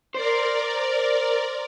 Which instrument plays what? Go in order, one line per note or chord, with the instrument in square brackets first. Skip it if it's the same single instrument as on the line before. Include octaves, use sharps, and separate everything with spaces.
[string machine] A#4 D5 [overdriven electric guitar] C5